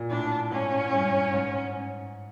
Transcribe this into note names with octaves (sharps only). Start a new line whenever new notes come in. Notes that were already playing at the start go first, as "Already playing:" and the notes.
Already playing: A#2
A2 D4
G#2 C#4
G2
G#2